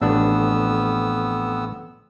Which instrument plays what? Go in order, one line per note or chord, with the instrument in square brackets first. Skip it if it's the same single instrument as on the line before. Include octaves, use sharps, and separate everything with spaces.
[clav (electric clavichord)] A1 D4 [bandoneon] F2 B3 E6